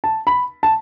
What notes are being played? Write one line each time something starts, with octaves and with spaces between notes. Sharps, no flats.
A5
B5
A5